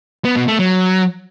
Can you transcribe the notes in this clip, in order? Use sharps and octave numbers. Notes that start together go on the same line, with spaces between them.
B3
B2
A3
F#3